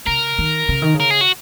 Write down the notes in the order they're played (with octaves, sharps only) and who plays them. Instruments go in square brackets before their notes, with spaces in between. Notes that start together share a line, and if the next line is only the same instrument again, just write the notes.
[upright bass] C#3 [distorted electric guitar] A#4
[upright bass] D#3
C#3
D#3
C#3
[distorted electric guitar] A#4
G#4
F#4